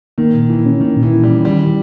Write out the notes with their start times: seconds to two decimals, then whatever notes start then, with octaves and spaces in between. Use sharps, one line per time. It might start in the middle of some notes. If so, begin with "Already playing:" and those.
0.18 D#3 A#3
0.34 A#2
0.50 E3 E4
0.66 C#4
0.80 D#3 A#3
0.97 A#2
1.03 E3
1.13 E4
1.23 G3
1.28 C#4
1.44 D#3 G3